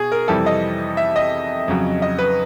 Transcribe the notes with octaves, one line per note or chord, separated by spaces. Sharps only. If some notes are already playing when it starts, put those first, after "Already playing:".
Already playing: B2 G#4
A#4
F2 C3 E3 G3 A4
D#5
E5
D#5
F2 C#3 F#3
D#5
B4